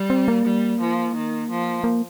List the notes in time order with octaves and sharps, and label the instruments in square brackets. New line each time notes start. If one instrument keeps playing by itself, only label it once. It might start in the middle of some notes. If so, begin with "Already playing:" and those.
Already playing: [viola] G3
[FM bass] C4
A#3
[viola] G3
F3
D#3
F3
[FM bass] A#3